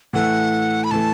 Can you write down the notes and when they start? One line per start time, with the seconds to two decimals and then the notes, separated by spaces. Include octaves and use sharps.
0.13 A2 E3 A3 F#5
0.84 B5
0.91 A2 E3 A3 A5